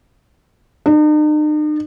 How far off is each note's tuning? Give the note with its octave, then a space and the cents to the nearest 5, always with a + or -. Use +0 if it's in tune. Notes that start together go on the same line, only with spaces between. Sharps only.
D#4 -45